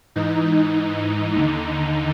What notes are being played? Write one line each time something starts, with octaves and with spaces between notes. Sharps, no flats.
G#2 E3 D#4
D#4
D#2 D3 D#4